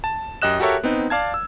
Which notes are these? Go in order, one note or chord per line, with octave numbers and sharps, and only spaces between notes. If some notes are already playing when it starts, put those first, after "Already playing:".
A5
F#2 G4 D#5 F#6 E7
F#4 G4 A4 A#4 C#5 E5
B3 C4 D#4
D5 F5 A5 G#6
E6